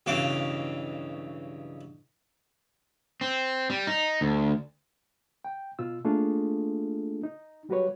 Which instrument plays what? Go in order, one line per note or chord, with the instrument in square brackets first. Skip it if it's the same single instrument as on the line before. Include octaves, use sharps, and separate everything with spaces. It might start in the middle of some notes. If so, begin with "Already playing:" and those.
[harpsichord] B1 G2 C#3 E3 F5 D6
[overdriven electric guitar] C4
G3
D#4
D2
[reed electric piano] G5
B2 F4 E6
A3 A#3 D4 F4 G#4 A4
D#4
F#3 G3 F#4 G4 B4 C#5